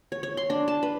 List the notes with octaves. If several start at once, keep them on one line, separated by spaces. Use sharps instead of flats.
C#5
C#5
C6
D4
A5
B4